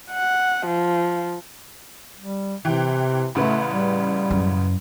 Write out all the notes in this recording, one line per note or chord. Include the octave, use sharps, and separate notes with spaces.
F#5
F3
G3
C3 E3 G5
A1 C#3 A3 B4
G3
F#2